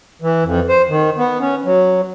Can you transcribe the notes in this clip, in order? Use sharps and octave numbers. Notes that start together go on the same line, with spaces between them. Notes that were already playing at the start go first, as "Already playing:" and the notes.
E3
F2
C5
D#3
B3
C#4
F#3